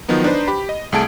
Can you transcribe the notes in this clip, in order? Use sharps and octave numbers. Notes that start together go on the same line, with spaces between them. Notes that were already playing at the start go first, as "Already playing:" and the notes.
D#3 F3 F#3 B3 D#4
D4 D#4 B4 C5
G4 B5
D#5
C2 A3 G#4 A5 G#6 D7